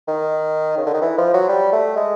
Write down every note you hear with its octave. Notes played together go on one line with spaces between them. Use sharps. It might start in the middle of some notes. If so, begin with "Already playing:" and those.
D#3
C#3
D3
D#3
E3
F3
F#3
G3
A3
G#3